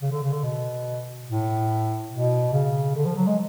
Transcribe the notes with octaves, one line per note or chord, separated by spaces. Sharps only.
C#3
D3
C#3
D3
B2
A2
B2
C#3
D3
F3
F#3
G#3